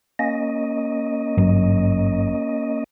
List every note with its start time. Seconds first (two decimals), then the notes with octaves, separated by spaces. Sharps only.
0.19 A#3 C#4 D#5
1.38 G#1 G2 F#3